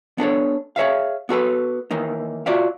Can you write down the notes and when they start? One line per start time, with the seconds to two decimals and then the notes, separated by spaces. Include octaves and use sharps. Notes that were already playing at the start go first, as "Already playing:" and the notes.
0.18 B3 D4 A4 C#5
0.76 G#4 C#5 E5 F5
1.29 B3 F#4 A4 B4
1.91 D#3 E3 A#3 D#4
2.46 F4 F#4 D5 E5 F5